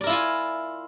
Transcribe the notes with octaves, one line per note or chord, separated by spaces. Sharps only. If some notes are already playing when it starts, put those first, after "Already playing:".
E4 F4 A#4 D5 G#5